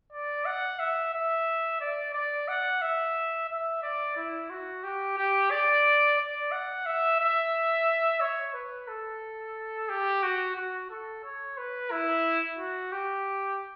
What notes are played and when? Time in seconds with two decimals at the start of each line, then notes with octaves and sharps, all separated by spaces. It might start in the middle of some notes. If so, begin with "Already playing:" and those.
0.13 D5
0.46 F#5
0.80 E5
1.13 E5
1.81 D5
2.14 D5
2.48 F#5
2.82 E5
3.49 E5
3.83 D5
4.16 E4
4.50 F#4
4.84 G4
5.17 G4
5.51 D5
6.19 D5
6.52 F#5
6.86 E5
7.20 E5
8.21 C#5
8.54 B4
8.88 A4
9.89 G4
10.23 F#4
10.56 F#4
10.90 A4
11.24 C#5
11.58 B4
11.91 E4
12.58 F#4
12.92 G4